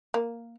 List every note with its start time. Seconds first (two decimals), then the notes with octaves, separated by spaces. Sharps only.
0.14 A#3